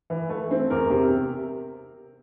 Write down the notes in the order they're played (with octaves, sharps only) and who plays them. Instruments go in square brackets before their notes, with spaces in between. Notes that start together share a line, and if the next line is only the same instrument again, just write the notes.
[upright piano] E3
A3
C4
[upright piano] E2 [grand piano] A#4
[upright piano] C3